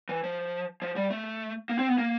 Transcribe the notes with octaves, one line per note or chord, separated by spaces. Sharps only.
E3
F3
F3
G3
A3
A#3
C4
B3
A#3